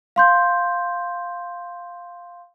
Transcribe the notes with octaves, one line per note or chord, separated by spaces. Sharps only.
F5 C6 G6